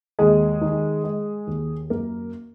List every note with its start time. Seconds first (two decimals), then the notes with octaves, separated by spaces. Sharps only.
0.19 D#2 G#3 G#4
0.61 D#3
1.04 G#3
1.47 D#2
1.90 F#2 A#3 A#4